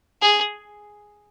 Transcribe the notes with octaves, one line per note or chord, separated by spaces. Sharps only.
G#4